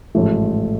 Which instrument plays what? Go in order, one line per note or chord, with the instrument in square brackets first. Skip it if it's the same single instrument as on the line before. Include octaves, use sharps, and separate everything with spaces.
[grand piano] A1 G#2 F3 A3